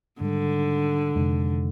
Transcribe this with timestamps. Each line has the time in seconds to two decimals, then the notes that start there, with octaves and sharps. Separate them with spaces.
0.21 G#2 D3 D#3 G3
1.15 F2 C3 D#3 G#3